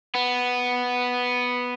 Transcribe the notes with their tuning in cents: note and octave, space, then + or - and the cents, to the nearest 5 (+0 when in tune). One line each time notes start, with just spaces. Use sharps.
B3 +0